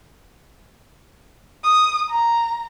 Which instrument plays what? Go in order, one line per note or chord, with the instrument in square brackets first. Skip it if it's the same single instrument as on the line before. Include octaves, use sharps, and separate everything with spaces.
[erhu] D#6
A#5